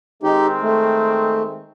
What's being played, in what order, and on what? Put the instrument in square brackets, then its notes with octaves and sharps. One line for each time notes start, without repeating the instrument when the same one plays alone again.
[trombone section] D#3 G#3 C4 [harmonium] D#4 G4
[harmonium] A3